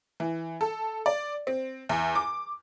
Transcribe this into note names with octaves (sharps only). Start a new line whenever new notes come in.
E3
A4
D5
C4
E2
D6